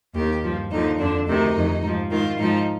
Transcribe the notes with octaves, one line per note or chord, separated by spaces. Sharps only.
D#2 D#3 G4
G2 F3
D#2 D3 F3 D#4
F2 D3 F3 D4
D2 C3 D#3 D#4
F2 D#3
G#2 F3
G#2 D#3 F4
G#2 F3 D#4